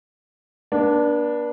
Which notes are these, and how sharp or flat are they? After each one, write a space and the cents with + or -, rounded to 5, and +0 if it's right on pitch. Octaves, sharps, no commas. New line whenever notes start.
B3 -45 D4 +0